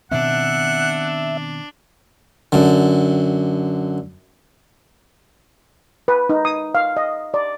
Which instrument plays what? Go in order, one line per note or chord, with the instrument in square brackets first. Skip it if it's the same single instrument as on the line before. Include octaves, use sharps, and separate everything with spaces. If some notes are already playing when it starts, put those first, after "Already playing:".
[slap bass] B2 D#3 C4 [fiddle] D4 [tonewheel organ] E5 [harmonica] F#5
[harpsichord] F#2 D3
[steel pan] B4
D#4
D#6
F5
D#5
D5